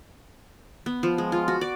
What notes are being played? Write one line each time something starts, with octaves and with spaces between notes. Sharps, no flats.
B3
F3
G#3
F4
F#4
D5